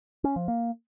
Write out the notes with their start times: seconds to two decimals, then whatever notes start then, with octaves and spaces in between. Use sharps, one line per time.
0.24 C#4
0.36 F3
0.48 A#3